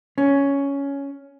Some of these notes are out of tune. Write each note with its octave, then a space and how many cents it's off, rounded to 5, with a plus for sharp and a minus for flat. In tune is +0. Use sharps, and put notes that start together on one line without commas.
C#4 +10